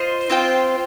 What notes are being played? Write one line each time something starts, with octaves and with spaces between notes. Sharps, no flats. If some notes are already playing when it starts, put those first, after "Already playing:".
Already playing: F4 C5 D#5
C4 F4 C5 G5